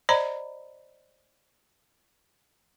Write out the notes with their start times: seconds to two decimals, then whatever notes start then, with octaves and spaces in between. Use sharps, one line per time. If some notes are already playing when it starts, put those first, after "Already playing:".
0.09 C5 D5 D#5 A#5 B5